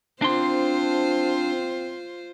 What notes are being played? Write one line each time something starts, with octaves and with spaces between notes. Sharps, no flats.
C4 D4 F4 C5 C6